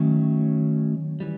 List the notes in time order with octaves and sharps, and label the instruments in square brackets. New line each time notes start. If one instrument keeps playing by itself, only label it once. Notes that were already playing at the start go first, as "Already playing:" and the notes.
Already playing: [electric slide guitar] D#3 F#3 A3 C#4
E3 G3